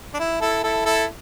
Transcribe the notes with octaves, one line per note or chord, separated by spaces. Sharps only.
D4
E4
E4 A4
E4 A4
E4 A4